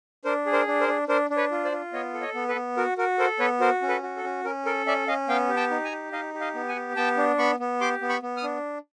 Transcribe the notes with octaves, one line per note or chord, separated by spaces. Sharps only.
D4 A#4 C5
G#4
A#4 C5
D4
A#4 C5
D4
D4 A#4 C5
D4
B4 C#5
F4
C5 D5
F4
B3 C#5 D#5
A4
C#5 D#5
B3
A4 B4
B3
F#4 A#4
F#4 A#4
A4 A#4 C5
B3 B4 C#5
F#4 A#4 C5
C#4
A4 B4
F#4
A4
C#4
C#4 A#4
A4 A#4
C#4 D5 E5
C#4 D#5 F5
B3 F5 G5
G4
G5 A5
D#4
G#5 A#5
G4
D#4 D#5 F5
G4
D#5 F5
B3
F#5 G#5
G4
B3 G5 A5
D4
B3 B5 C#6
B3
G4 C6 D6
B3
B5 C#6
B3
D#6 F6
D4